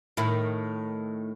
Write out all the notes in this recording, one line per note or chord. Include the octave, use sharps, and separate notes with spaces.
A2 D#3 E4